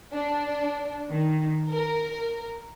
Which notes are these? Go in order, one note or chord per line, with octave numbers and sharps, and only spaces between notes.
D4
D#3
A#4